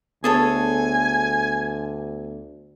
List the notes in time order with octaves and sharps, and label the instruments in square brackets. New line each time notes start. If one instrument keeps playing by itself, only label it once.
[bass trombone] D2 [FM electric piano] B3 [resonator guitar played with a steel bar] G#4 A4 C#5 [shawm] G#5